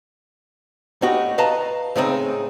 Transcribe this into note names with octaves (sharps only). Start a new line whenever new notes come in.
A2 D#4 F#4 G4
B4 D#5 F5 A5 A#5
A2 C#3 G#3 B3 C4 D#4